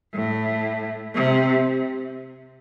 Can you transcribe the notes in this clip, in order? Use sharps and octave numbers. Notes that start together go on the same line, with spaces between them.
A2
C3